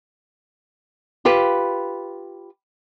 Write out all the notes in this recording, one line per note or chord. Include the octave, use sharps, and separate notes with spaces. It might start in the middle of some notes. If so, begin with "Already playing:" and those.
F4 G4 B4